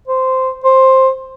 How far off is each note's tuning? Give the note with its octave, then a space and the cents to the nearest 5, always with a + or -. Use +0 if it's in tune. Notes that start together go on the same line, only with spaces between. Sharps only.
C5 -10
C5 +10